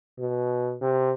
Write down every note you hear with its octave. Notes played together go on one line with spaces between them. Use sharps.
B2
C3